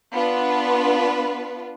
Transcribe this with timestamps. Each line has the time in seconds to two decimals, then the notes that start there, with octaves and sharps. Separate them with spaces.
0.12 B3 D4 F4 B4